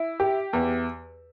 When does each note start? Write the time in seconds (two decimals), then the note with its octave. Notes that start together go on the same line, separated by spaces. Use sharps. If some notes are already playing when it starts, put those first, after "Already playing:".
Already playing: E4
0.20 G4
0.53 E2